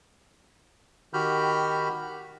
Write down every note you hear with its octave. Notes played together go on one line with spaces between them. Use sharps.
D#3 F#4 G4 B5 F6 G6